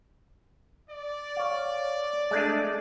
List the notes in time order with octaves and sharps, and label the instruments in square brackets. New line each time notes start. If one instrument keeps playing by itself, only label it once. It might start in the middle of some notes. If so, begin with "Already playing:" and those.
[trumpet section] D5
[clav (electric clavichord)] C#5 F5
G#3 A3 D4